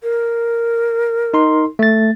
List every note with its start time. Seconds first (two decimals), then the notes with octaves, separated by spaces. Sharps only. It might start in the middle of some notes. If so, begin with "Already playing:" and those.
0.03 A#4
1.34 D#4 C6
1.79 A3 A6